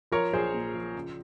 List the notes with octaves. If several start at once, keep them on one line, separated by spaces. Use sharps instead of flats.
F3 A#4 C#5
A#1 G#4 C5
A#2
F3
C#3